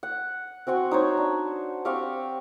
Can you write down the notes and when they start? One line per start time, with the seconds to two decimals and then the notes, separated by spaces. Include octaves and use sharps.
0.03 F#5
0.67 C4 F#4 F#5 G#5
0.91 D#4 C5 C#5
1.17 D4
1.85 C4 G4 F5 C#6